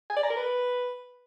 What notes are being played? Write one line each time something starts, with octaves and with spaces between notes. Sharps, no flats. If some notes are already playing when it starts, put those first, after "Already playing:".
G#5
D5
A#5
A#4
B4